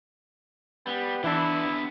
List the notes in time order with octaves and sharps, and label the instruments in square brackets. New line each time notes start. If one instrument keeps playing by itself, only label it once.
[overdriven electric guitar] G3 [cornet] B3
[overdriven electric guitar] D3 B3 [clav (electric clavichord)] E3 D4 [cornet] E4